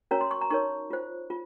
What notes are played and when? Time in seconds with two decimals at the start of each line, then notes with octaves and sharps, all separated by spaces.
0.11 C#4 F#4 A#4 C#5 A#5
0.21 C6
0.31 C#6
0.41 A#5
0.50 D#4 A#4 C#5 C#6
0.90 F4 C5
1.30 F4